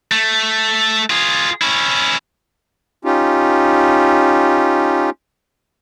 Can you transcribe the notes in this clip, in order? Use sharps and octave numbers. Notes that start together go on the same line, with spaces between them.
A3
F4 G#4
C#4 E4
C#4 D#4 F4 G4